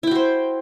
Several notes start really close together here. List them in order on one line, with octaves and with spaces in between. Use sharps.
E4 G5 F#4 C5